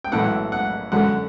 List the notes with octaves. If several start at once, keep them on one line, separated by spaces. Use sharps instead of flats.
G5
B1 A2 E3 F#5
F#5
F#2 D3 F#5